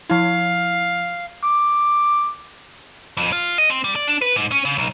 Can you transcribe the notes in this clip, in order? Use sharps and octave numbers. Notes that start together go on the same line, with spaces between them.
F3 E4 F5
D6
F2
F4
D#5
C4
G3
D5
D4
B4
G#2
C#4
C#3
B1